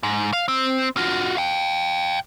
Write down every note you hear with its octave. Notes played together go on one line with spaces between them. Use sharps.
G#2
F5
C4
F4 F#4
F5 G5